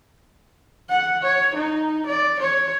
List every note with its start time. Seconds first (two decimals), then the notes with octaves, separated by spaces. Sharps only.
0.90 F#5
1.23 C#5
1.55 D#4
2.06 D5
2.40 C#5